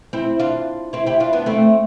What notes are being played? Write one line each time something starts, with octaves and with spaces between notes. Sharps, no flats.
C4 E4
D4 F4
C4 E4
E4 G4
D4 F4
B3 D4
A3 C4